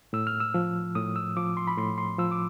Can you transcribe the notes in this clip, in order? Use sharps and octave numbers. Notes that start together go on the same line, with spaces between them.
A2 E6
F6
E6
F3
A2 D#6
E6
F3 D6
C6
B5
A2 C6
C6
F3 E6
D6